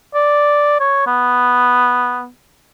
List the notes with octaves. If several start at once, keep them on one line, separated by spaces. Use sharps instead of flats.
D5
C#5
B3